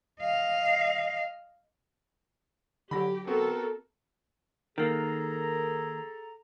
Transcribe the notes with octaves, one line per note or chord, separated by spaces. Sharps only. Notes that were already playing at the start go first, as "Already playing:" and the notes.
D#5 F5
D3 F#3 G4 B5 A#6
B3 C4 F#4 A4 A#4
D#3 A#3 G#4 A4 A#5